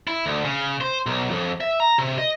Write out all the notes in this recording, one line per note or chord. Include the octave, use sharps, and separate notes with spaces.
E4
D2
C#3
C5
B1
F2
E5
A#5
C3
D#5